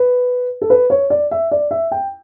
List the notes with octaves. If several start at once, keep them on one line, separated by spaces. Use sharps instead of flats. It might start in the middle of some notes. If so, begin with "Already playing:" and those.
Already playing: B4
A4
B4
C#5
D5
E5
D5
E5
G5